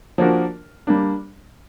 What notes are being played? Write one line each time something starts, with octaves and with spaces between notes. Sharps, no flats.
F3 A#3 D4 F#4 A#4
G3 A#3 D4